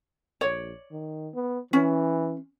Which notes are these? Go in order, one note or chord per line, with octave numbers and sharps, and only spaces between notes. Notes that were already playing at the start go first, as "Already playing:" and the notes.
A#1 C#5 D5
D#3
B3
E3 C#4